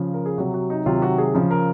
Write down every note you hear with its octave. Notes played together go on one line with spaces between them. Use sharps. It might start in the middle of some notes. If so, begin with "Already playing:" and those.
Already playing: C#3 F3
A#4
G#4
C3 F#3 F#4
F#4
D#4
C3 D#3 F#3 F4
F#4
G#4
C#3 F3
A#4